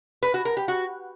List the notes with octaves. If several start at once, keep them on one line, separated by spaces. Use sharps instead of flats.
B4
F#4
A#4
G4
F#4